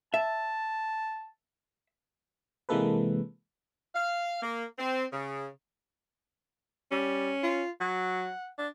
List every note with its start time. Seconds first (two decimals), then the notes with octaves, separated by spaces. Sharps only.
0.14 E5 A5
2.69 C3 E3 G#3 A#3 A4 B4
3.94 F5
4.42 A#3
4.78 C4
5.12 C#3
6.91 G3 C#4
7.43 F4
7.81 F#3 F#5
8.58 D4